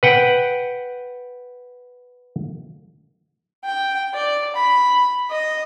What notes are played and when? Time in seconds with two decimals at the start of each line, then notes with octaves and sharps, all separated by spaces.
0.03 B4 F#5 G5
3.65 G5
4.14 D5
4.56 B5
5.30 D#5